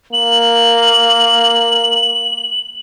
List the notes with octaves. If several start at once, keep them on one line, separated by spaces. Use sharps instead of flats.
A#3 F#7